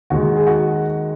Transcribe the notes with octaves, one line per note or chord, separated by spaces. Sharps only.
D#2 D#3 G#3 F#4
G#4
F#4